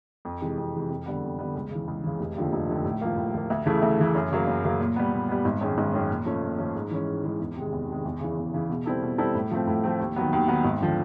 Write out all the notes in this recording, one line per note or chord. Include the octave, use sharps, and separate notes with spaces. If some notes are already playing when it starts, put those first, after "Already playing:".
F2
C3 E3 G#3
F2
C3 E3 G#3
F2
D3 G3 B3
F2
D3 G3 B3
C#2
C#3 E3
C#2
C#3 E3
F1
D#2 D3 F3
F1
D#2 D3 F3
A2
F3 A#3
A2
F3 A#3
D2
C#3 E3 A3
D2
C#3 E3 A3
F#2
C#3 F#3 A#3
F#2
C#3 F#3 A#3
A#2
G3 B3
A#2
G3 B3
G#1
F#2 D#3 G#3 C#4
G#1
F#2 D#3 G#3 C#4
A#2
F3 A3 C#4
A#2
F3 A3 C#4
G#2
E3 G#3 C#4
G#2
E3 G#3 C#4
E2
C3 D#3 G#3
E2
C3 D#3 G#3
E2
C#3 E3
E2
C#3 E3
B2
G3 C4 E4 A4
B2
G3 C4 E4 A4
A2
F3 A3 C4
A2
F3 A3 C4
D#2
D#3 F#3 B3
D#2
D#3 F#3 B3
G#1
D3 F3